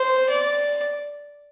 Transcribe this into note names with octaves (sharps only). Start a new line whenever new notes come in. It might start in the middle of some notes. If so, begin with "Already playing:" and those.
Already playing: C5
D5